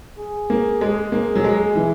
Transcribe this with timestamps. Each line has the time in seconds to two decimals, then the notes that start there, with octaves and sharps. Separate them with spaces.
0.18 G#4
0.50 A#3
0.81 G#3
1.12 A#3
1.35 F#3
1.44 G#3
1.75 E3